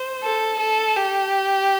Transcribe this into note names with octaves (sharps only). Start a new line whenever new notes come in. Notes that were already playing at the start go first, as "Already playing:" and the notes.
Already playing: C5
A4
A4
G4